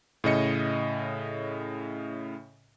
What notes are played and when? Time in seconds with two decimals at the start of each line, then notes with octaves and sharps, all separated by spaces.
0.24 A2 C#3 D#5 C#7